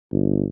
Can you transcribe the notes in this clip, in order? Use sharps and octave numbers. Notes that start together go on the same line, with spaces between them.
G1